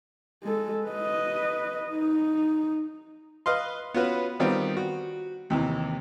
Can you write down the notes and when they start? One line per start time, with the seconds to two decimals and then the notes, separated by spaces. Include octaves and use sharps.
0.43 G#3 A4
0.87 B4 D#5
1.91 D#4
3.46 B4 D#5 F5 C6
3.94 B3 C#4 F4 F#4 B4
4.40 D#3 G3 B3 C4 F4
4.77 F#4
5.50 D#2 C3 E3